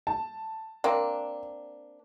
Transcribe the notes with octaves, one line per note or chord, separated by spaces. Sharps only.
A5
A#3 C4 D4